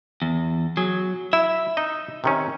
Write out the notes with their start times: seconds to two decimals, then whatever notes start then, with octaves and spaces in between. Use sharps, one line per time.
0.22 E2
0.77 F#3 G#4
1.33 E4 E5
1.77 D#4 D#5
2.24 C3 D#3 C#4